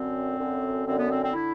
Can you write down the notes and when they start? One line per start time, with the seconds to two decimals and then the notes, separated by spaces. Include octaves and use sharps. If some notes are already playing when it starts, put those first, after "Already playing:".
Already playing: F#2 D3 C4
0.39 F#2 D3
0.86 F#2 D3 C4
0.98 B3
1.10 C4
1.22 C4
1.33 D3 E4